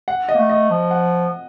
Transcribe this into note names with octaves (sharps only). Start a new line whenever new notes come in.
F#5
D#5
A#3
A3
D#5
F3
F#5